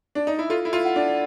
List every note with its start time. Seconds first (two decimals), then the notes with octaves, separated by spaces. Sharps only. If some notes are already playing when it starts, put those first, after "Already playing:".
0.15 D4
0.27 D#4
0.39 E4
0.50 F4 A4
0.65 E4
0.73 F4
0.85 F#5
0.96 D4